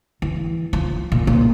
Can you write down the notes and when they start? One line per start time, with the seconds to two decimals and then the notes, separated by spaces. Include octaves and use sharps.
0.22 E3
0.73 F3
1.12 A#2
1.27 A#2